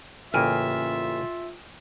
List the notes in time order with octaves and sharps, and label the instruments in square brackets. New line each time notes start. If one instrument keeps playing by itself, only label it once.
[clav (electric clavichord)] A1 C#3 A#3 [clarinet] F4 [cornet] E5 [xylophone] G5 G#5 F6